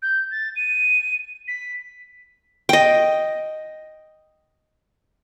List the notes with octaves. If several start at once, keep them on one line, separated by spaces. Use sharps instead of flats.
G6
A6
D#7
B6
D#5 G5